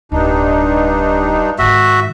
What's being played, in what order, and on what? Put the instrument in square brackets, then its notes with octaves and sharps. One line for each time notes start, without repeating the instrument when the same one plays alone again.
[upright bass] D1 [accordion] G2 D4 D#4
[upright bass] G#2 D#3 [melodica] F#4 E5